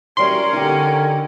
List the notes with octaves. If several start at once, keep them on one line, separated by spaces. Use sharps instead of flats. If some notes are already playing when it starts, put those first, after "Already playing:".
E3 F#3 G3 C#4 A#4 C6
D3 D#4 G4